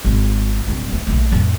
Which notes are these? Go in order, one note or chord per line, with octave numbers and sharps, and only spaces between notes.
G#1
D1 G2
A3
A#1 A3
F2 A2